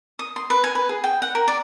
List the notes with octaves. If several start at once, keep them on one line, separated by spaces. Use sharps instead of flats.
D#6
C6
B4
G#5
B4
G#4
G5
F#5
A#4
D5